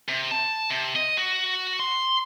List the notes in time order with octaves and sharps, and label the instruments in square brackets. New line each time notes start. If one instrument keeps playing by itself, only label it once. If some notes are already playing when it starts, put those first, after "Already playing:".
[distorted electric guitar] C3
A5
C3
D#5
F#4
C6